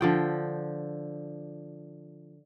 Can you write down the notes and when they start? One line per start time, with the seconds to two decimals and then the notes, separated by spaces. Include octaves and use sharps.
0.01 D3 F3 G5